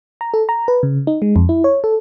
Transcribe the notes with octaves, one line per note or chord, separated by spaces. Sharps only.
A#5
A4
A#5
B4
C#3
D#4
G#3
F2
E4
C#5
A4